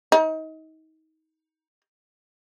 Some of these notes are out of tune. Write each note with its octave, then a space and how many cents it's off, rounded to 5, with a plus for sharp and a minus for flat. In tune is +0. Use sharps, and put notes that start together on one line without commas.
D#4 +30